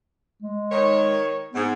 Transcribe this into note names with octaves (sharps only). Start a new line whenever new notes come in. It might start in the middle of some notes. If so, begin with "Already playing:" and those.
G#3
D#3 C#5
G#2 B3